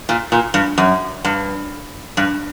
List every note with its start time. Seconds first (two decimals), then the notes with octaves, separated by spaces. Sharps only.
0.09 A#2
0.32 A#2
0.54 G2
0.78 F#2
1.25 G2
2.17 G2